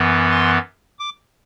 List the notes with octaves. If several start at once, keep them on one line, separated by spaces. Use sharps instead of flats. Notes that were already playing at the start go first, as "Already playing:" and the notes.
Already playing: F#2 E3 B3
C6
D6